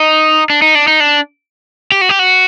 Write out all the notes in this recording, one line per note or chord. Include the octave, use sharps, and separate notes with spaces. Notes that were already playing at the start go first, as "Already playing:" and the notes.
Already playing: D#4
D4
D#4
D4
D#4
D4
G4
F#4
G4
F#4